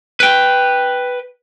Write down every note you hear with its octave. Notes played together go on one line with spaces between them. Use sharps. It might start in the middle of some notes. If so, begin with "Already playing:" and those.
B4 G5